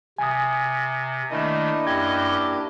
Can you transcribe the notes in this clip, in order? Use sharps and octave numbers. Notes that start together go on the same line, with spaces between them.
C3 G#5 D#6
D#3 A3 A#3 D4 E4 D#5
F#2 G4 D#5 G#6